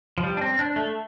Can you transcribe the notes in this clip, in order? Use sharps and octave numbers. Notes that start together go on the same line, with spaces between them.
F3
G3
D4
C4
D4
A3